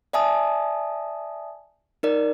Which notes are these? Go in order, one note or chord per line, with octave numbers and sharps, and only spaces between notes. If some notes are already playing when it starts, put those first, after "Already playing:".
D5 E5 G#5 A5 D#6
D#4 A#4 D5